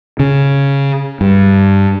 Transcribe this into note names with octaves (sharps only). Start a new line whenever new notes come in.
C#3
G2